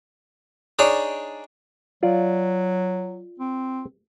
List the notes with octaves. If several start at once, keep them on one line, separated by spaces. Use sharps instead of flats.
D4 D#4 G#4 C#5 D5
F#3 F4 D5
C4